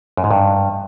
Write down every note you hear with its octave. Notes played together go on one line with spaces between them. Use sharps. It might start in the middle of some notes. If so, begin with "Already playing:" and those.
F#2
G#2
G2